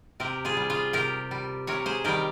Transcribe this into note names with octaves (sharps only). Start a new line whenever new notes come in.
C3 G4 A#4
F4 G#4
G3
F4 G#4
C3 G4 A#4
G3
C3 A#4 C#5
G#4 C5
D#3 G3 G4 A#4